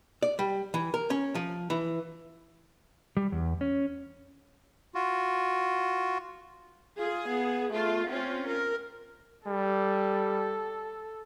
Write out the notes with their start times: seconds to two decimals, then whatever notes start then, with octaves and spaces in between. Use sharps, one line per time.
0.23 D5
0.39 G3
0.74 E3
0.94 A#4
1.10 C#4
1.35 F3
1.70 E3
3.17 G3
3.32 E2
3.61 C#4
4.95 F4 F#4
6.98 F4 G#4
7.28 B3
7.73 A3 F4
8.08 C4 C#4 F4
8.47 A#4
9.47 G3 A4